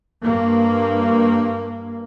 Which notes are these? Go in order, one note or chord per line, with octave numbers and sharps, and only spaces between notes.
G2 A#3